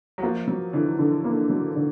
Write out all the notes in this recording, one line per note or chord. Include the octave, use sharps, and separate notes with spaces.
F#3
F3 A#3
F#3
D3 E3
D3
A#3
F#3
D3